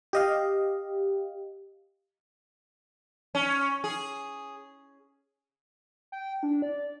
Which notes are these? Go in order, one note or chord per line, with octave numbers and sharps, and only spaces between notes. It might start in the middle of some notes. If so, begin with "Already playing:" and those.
G4 D#5 F5
C#4
G#4
G5
D4
D5